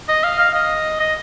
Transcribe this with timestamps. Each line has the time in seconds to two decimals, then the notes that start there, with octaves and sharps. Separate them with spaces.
0.08 D#5
0.24 F5
0.39 F5
0.54 D#5
1.00 D#5